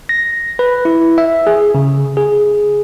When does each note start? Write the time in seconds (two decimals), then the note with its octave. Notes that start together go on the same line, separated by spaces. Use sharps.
0.09 A#6
0.59 B4
0.85 E4
1.18 E5
1.47 G#4
1.75 C#3
2.17 G#4